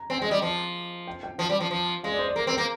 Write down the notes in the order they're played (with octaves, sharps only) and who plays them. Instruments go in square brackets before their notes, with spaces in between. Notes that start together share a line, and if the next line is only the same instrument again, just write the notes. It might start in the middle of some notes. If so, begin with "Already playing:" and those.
Already playing: [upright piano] A#5
[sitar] C4 [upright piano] G#5
[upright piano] G5
[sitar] G#3
[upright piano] D#5
[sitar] G3
F3
[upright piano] G5
G5
[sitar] F3 [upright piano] G5
[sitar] G3
F3
F3
[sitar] G#3 [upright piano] F5
[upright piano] D5
C5
D5
[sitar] A#3 [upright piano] A#4
[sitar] C4
[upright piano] C5
[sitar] A#3